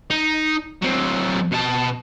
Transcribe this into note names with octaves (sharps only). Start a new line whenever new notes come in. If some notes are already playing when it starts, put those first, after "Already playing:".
D#4
F#3 C4
B2 A5